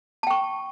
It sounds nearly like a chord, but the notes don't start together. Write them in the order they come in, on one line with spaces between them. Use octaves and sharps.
A5 G5 C#6